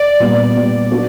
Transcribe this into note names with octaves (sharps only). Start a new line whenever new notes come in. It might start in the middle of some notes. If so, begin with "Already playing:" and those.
Already playing: D5
A#2 G3 B3
A#2 G3 B3
F#3 B3 D4 F#4 A4